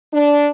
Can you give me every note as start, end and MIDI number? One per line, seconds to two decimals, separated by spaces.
0.12 0.47 62